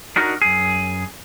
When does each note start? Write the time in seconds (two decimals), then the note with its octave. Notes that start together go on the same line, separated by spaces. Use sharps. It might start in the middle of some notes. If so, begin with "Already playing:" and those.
0.16 D4 D#4 F#4 A#4
0.42 F#2 G#4